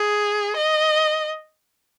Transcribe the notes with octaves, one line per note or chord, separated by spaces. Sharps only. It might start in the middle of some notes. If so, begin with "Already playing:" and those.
Already playing: G#4
D#5